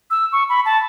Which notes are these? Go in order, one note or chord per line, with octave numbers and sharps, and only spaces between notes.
E6
C#6
B5
A5